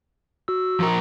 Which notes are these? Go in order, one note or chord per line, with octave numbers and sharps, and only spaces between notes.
F#4 E6
F3 A#4